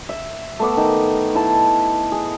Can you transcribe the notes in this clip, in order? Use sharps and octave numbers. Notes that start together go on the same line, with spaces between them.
E5
A3 B3 D6
D#3
E4 A5
G#4